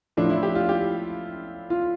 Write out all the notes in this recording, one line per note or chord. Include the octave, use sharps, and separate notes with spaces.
A2 F3 D4
E4
G4
F4
G4
F4